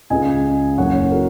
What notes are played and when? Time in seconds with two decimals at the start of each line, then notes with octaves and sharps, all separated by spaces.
0.10 C#2 C#3 G#3 D#5 G#5
0.78 F#1 F#2 C#3 F#3 C#5 F#5
1.11 F#4 A#4